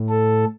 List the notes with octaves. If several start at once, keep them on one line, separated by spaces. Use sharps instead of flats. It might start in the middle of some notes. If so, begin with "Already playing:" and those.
Already playing: A2
A4